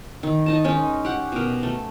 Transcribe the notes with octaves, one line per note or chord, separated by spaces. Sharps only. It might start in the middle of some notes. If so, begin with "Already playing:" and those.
D#3
D#4 D#5 A5
G#3 C#4 D#4
G4 F#5
B2 A#4
A3